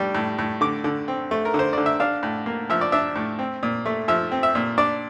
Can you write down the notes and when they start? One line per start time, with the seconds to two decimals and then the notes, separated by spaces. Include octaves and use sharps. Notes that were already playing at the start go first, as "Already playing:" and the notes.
Already playing: A2 G3 D4
0.15 A2
0.39 A2
0.61 D3 D6
0.84 D3
1.08 C4
1.31 A3
1.45 A#4
1.54 D3
1.59 C5
1.73 D3 D5
1.86 E5
2.00 D4 F5
2.23 A2
2.46 A#3
2.70 F3 E5
2.81 D5
2.92 D4 E5
3.16 A2
3.39 C4
3.63 A#2
3.86 A3
4.08 F3 E5
4.32 C4
4.43 E5
4.55 A#2
4.78 D4 D5